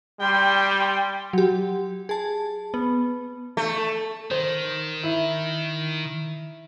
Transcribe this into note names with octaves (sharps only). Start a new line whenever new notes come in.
G3 G5 C6
F#3 G4
G#4 A5
B3
A3
D#3 C5
E4